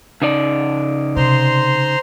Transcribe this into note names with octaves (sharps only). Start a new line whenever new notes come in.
C#3 D#4 D5
C3 C5 A#5 C6